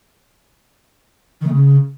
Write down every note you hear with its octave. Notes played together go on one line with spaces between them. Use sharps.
D#3
A3
C#3